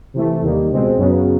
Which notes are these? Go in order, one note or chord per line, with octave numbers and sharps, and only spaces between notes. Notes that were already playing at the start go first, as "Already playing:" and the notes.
C3 E3 A3
D#2 D#3 G3 A#3
C#2 B2 G#3 C4
F#2 C#3 F#3 B3